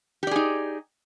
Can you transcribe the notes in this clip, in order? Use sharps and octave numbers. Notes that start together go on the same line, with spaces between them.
D#4 G4 G#4 D5